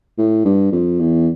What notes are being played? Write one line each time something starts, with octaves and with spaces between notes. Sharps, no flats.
A2
G2
F2
E2